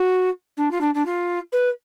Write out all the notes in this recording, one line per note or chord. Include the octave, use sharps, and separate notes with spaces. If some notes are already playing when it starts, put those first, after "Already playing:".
Already playing: F#4
D4
F4
D4
D4
F4
B4